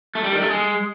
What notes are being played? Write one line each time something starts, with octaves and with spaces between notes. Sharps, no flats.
A3
G3
D#3
A3
G#3